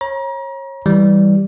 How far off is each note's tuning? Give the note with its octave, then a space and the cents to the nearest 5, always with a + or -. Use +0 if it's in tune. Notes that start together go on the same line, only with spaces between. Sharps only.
C#5 -30 A#5 +35
E3 -5 G3 +0